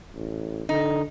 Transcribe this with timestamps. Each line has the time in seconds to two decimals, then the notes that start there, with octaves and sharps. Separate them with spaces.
0.15 A1
0.69 D3 D#4